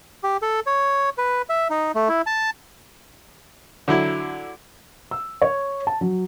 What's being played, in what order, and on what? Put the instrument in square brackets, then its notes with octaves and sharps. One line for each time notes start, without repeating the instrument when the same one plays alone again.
[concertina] G4
A4
C#5
B4
E5
D#4
A3
E4
A5
[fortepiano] D3 F#3 E4
[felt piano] E6
C#5
A5
F#3